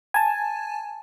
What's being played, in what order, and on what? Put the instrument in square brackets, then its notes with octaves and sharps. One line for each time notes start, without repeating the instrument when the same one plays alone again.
[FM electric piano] G#5 A5